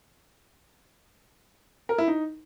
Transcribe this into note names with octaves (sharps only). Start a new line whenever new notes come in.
A#4
E4
D#4